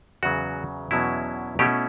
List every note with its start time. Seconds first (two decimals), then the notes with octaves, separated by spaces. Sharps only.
0.23 E2 C#3 F#3 F#4
0.91 E2 B2 F#3 C#4 E4
1.59 B2 A3 C#4 E4 G4